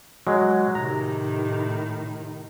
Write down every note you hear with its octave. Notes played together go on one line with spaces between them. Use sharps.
F#3 G#3
A2 C3 D#3 A#5